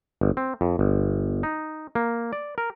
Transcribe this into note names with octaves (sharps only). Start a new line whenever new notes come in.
G1
C4
F2
G1
D#4
A#3
D5
A#4